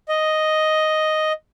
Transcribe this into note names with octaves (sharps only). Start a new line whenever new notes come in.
D#5